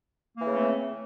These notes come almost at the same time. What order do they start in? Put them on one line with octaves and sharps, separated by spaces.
A#3 E3 C#3 A3 C4